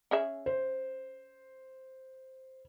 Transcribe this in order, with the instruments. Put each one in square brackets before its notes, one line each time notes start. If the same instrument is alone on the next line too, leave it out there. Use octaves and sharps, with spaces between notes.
[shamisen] C#4 G#4 E5
[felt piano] C5